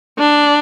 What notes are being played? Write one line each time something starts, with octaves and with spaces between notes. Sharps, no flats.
D4